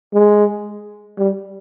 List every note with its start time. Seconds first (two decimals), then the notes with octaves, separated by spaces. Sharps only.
0.13 G#3
1.18 G3